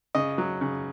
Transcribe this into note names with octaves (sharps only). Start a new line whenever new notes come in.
C#3 D#5
F#3
C#3